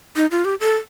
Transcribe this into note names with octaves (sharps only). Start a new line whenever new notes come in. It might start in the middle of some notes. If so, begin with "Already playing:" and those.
D#4
F4
G4
A4